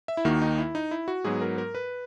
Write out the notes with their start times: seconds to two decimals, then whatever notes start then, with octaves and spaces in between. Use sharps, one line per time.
0.08 E5
0.17 E4
0.25 D#2 D#3 A#3 F#4
0.42 D#4
0.58 E4
0.75 D#4
0.91 E4
1.08 F#4
1.25 G#2 F#3 B3 G#4
1.41 A#4
1.58 A#4
1.75 B4